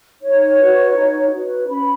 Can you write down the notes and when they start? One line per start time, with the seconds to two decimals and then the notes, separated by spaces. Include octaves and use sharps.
0.22 D#4 C#5
0.59 F#4 B4
0.95 D#4
1.32 F#4 B4
1.68 C#4 B5